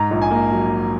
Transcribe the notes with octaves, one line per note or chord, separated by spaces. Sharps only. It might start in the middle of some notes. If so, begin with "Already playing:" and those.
Already playing: G#2 A#5
A#1
G#5
A#3
F#3